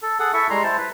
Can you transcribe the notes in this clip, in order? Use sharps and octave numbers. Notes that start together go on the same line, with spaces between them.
A4
G#4 A4 F#5
E4 A4 E5 C#6
G3 G#3 A#5 C6
E4 C5 A5
B4